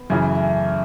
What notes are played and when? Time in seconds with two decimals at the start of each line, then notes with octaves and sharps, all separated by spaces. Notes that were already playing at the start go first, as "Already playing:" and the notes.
Already playing: B3
0.09 F#2 C#3 E3 A3
0.35 A3